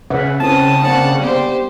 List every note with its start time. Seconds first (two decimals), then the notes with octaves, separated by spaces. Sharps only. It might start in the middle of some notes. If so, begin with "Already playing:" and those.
0.10 C#3 B4 E5 F#5
0.40 C4 C#4 E4 B4 A5 D#6
0.82 A#3 C4 D4 F#5
1.21 G3 B3 G4 C5